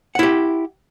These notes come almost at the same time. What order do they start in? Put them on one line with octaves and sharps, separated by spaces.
F#5 E4 G4